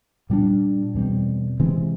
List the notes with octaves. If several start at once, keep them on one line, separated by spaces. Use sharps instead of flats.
A#2 G3 B3 D4
E2 B2 G3 C4
C3 E3 G#3 C4